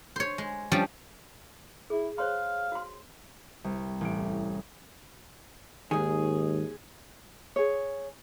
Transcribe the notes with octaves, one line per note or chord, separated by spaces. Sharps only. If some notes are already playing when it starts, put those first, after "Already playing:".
C5 C#5
G#3
F3 G3 C#4 D4
E4 G#4
C5 C#5 F5 C6
F#4 C6
C2
A1 D7
D#2 G#2 D#3 G#4
G#4 C#5